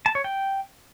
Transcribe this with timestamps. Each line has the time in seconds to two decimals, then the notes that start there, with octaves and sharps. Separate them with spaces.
0.06 A5
0.15 C#5
0.24 G5